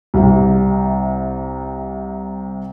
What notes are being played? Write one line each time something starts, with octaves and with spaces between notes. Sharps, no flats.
C2 C3